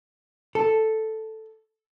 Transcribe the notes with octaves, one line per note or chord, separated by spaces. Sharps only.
A4